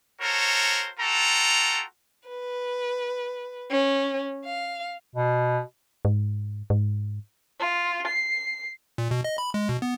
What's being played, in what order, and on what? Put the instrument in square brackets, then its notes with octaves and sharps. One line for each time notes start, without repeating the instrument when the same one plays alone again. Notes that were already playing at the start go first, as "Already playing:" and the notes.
[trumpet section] F#4 A4 A#4 C5 C#5
F4 F#4 A4 G5 A#5
[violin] B4
C#4
F5
[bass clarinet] B2
[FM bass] G#2
G#2
[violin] F4
C7
[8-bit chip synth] A#2
B2
D#5
B5
G#3
B2
B3